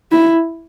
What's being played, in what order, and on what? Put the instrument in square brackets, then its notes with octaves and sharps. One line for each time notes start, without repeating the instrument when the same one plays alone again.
[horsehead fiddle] E4